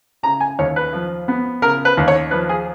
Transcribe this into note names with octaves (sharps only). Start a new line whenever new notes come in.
C#3 A#5
G#5
D#2 C#5
B4
F3
B3
C#3 A#4
B4
D#2
C#5
F3 B4
G#4